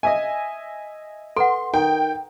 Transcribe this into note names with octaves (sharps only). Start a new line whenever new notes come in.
D#5 E5 G#5
A4 B4 F#5 C6
D#3 G5